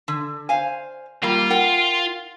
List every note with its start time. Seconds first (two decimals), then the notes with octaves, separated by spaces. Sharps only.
0.08 D3
0.49 C5 F5 G#5
1.23 G3 A#3 F4
1.50 A#4 F#5 G5